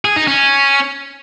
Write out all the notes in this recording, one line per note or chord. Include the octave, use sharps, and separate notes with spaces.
G#4
D#4
C#4